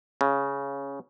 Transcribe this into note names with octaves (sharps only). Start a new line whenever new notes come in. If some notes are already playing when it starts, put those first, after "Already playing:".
C#3